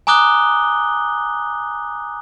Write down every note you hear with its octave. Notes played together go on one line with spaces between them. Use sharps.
G#5 A#5 D6 D#6 F#6 G7